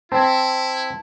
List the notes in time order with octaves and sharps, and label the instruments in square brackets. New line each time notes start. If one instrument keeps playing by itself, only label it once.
[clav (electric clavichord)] C4 [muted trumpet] E4 [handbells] A5